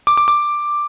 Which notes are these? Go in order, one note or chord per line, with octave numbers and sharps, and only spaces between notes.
D6
D6
D6